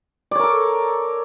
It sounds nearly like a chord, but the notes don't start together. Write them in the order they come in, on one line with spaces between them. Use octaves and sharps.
D5 C#5 A#4 A4